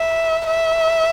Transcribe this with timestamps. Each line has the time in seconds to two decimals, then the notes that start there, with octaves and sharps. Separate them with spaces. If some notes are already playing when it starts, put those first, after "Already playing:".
Already playing: E5
0.47 E5